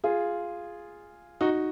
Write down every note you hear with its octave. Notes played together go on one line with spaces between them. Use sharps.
F4 G#4
D#4 F#4